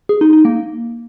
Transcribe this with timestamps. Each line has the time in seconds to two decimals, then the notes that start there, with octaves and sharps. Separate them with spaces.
0.09 G#4
0.21 D#4
0.33 D#4
0.45 A#3